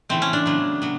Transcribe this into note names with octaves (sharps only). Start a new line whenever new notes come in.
C#3 E3 A3 C4
C#4
D4
C#3 F#3 B3
F#3 B3